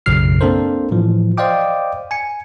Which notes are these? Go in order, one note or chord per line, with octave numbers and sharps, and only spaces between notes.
B1 F#2 C#3 F#3 F6 C7
A#3 C4 D4 A4 A#4 C5
A2 E3 F3
C5 D5 D#5 F5 G5 D6
G#5 C#7